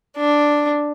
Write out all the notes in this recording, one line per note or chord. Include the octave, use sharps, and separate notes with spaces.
D4